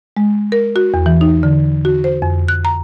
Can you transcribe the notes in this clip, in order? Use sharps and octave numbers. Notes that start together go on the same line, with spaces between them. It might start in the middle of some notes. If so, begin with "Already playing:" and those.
G#3
A#4
F#4
E2
E3
D#4
D3
F#4
C5
F2
F#6
A#5